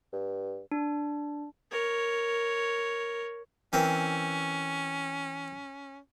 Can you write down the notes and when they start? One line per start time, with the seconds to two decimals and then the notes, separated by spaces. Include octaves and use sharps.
0.13 G2
0.71 D4
1.71 A#4 C#5
3.73 E3 C4 C#4 A#4